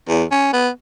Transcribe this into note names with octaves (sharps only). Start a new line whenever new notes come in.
E2
C#4
B3